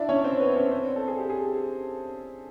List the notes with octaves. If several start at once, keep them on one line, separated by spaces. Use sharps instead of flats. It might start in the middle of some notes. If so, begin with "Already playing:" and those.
Already playing: D4 E4 D5 E5
C#4 C#5
C4 C5
B3 B4
C#4 C#5
C4 C5
A4
G#4
G4
G#4